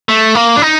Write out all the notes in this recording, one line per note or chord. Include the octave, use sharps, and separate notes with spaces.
A3
A#3
D4
D#4